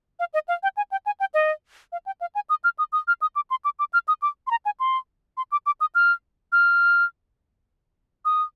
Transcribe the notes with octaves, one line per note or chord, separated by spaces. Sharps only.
F5
D#5
F5
G5
G#5
G5
G#5
G5
D#5
F5
G5
F5
G#5
D#6
F6
D#6
D#6
F6
D#6
D6
C6
D6
D6
F6
D#6
D6
C6
A#5
G#5
C6
C6
D6
D6
D#6
F6
F6
D#6